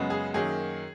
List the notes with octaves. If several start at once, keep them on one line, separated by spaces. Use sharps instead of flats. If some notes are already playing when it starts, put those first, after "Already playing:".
Already playing: F#2 C#3 G#3 B3
G#4
F#2 D#3 F#3 A#3 G#4